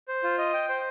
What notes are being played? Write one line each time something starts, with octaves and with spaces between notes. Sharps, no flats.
C5
F4
D#5
G5
C5